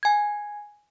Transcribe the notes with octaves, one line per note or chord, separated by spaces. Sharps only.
G#5 G#6